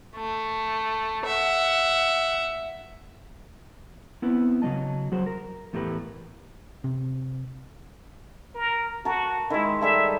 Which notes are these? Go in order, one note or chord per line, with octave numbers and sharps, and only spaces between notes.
A3
E5 F#5
B3 C4 E4 B4
C#3 F#3 G#3 D#5 A5
F#3 F#4 G#4 C5
A#4
E2 A2 A3 G4 A#4 B4
C3
A#4
F#4 A#4 A5
D#3 G#3 E4
G3 G#4 A4 E5